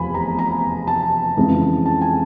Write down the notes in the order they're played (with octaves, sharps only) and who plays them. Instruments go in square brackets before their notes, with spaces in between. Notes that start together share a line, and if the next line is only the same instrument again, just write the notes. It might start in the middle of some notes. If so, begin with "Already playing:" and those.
Already playing: [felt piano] F1 E2 F3 G#5 B5
A#5
A#5
A5
F2 C#3 E3 G#3
A5
G#5